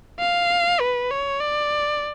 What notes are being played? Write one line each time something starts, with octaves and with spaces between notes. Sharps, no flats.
F5
B4
C#5
D5